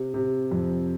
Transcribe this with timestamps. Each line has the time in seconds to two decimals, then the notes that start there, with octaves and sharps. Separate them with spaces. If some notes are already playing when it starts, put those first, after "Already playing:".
Already playing: C3
0.14 C3
0.51 F2